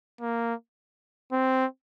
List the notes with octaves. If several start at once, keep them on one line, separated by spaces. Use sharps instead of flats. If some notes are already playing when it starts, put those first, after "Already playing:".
A#3
C4